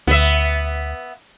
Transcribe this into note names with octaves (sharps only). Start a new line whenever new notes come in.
D2 B3 E5